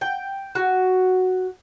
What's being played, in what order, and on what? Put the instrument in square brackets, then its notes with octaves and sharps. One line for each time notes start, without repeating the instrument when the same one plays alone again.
[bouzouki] G5
F#4